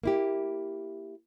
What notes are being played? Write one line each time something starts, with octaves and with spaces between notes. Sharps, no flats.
A#3 E4 G4